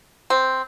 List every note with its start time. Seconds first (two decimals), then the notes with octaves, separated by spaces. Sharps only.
0.30 C4